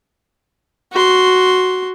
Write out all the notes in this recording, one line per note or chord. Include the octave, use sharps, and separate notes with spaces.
F#4 C6